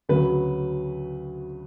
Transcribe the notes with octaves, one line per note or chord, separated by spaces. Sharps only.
D2 C#3 F#3 B4